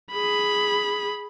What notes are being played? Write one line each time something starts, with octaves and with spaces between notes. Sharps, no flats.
G#4 B5